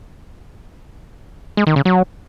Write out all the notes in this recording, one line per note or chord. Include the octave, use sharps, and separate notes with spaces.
G#3
D#3
C#3
F#3